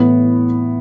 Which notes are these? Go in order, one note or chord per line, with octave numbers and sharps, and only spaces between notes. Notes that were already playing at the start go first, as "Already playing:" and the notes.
Already playing: A2 E3 B3